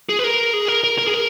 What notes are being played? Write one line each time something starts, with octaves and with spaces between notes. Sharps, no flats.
G#4
B4
A#4
G#4
A#4
A#4
A#4
G#4
A#4